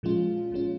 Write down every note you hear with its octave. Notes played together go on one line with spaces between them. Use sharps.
A#2 F3 G#3 C#4 F4
A#2 F3 G#3 C#4 F4